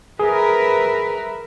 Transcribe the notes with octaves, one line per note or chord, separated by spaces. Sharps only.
G#4 A#4 B4 E5